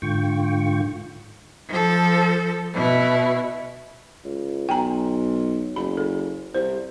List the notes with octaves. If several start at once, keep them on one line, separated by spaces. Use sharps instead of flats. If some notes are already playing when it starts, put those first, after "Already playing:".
G#2 D3 F4 G5 C#6
F3 A4
B2 E4
C#2
B1 G5 G#5 A#5
F#1 B5
A4
C2 C5